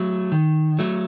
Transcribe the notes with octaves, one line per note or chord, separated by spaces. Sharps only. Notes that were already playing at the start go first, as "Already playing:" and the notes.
Already playing: F#3 A3
D#3
F#3 A3